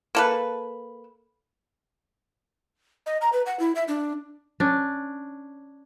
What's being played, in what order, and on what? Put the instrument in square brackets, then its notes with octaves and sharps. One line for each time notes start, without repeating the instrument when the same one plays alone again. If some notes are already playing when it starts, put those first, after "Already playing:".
[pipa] A#3 A4 B4
[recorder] D#5
A#5
B4
F#5
E4
E5
D4
[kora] C#4 D4